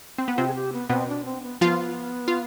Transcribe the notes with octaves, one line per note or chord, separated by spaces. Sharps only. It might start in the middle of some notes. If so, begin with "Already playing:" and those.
C4
B3
C3 C4 F4
G#4
G4
B3
B2 B3 C4
D4
C4
B3
F3 B3 F4
F4